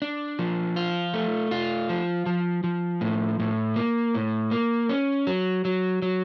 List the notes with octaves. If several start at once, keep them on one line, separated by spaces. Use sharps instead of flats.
D4
F3
F4
A3
F4
F3
F3
F3
A2
A2
A#3
A2
A#3
C#4
F#3
F#3
F#3